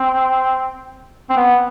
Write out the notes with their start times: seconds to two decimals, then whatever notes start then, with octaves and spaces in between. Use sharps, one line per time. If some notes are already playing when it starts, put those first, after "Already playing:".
Already playing: C4
1.30 C4
1.37 B3